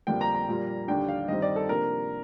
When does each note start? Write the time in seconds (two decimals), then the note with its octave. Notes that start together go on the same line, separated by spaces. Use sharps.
0.07 F2 D3 G3 A#3 D4 G5
0.21 A#5
0.35 A#5
0.48 A#2 G3 A#3
0.88 D#2 D3 G3 D4 G5
1.09 F5
1.28 G2 D#3 G3 C4 D#5
1.42 D5
1.56 A4
1.69 C3 F3 A#3 D4 A#4